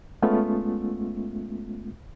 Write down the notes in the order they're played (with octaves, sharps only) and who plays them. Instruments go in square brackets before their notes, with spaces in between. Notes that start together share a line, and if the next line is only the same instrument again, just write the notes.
[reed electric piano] G#3 A3 B3 C#4 F4